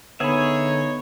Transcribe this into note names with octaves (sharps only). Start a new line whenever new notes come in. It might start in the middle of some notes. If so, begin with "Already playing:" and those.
D3 B3 D#4 G#4 C#5 E5 B5